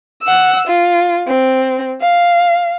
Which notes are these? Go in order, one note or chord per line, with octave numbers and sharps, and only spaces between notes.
F#5 E6
F4
C4
F5